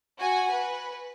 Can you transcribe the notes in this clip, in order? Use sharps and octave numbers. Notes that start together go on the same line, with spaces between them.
F#4 G#5
B4